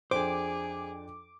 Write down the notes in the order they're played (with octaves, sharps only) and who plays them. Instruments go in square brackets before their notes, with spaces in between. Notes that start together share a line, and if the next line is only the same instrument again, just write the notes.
[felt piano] F2 D4 G5 [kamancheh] G#4 [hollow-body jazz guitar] C5 [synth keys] D6